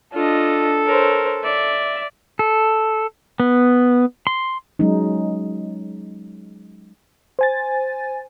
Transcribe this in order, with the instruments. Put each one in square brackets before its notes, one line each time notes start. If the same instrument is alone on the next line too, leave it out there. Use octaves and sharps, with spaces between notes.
[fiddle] D4 D#5 [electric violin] F4 [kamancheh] A4
[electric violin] A#4 [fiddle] C5 C#5
[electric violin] D5 [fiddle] E5
[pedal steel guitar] A4
B3
C6
[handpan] F#3 G#3 C#4 D#4
[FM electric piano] C5 G#5 A6